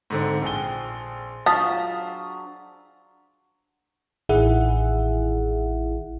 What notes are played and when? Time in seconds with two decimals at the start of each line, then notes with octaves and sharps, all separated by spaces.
0.10 G#2 D3 C4
0.42 A#1 G#4 C5 G5 G7
1.46 F#3 D4 F4 A5 D#6 B6
4.29 A1 D#3 E4 G#4 E5 F#5